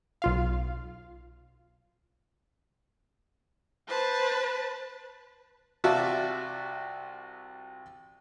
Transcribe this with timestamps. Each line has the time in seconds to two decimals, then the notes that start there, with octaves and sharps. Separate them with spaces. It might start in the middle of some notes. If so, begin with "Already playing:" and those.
0.22 B1 F4 F5
3.88 B4 C5 A5
5.84 C2 F4 F#4 D5 E5 A5